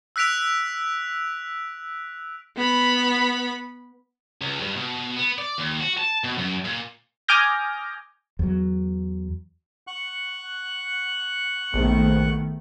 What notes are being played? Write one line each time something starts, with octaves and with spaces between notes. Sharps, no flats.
E6 F#6 B6 D7 F7
B3 B5
C#2
G2
B2
B3
D5
D#2
F#4
A5
B2
F#2
A#2
G#5 D6 D#6 F6 G6 A#6
E2 F#3
F#5 C#6 F#6
A#1 D#3 A3 B3